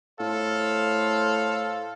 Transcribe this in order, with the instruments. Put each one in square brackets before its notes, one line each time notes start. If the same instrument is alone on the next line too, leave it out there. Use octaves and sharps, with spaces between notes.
[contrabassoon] A2 [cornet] A4 [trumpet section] C5 F5